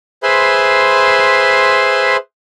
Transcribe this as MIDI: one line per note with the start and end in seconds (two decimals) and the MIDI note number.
0.23 2.17 68
0.23 2.17 71
0.23 2.17 72
0.23 2.17 76
0.23 2.17 83
0.23 2.17 84